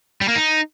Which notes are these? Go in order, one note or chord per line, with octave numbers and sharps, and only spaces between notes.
G3
A#3
D#4